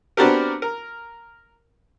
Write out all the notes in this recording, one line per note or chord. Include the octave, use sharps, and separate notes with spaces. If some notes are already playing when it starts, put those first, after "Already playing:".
B3 C4 D4 F#4 G4 A#4
A#4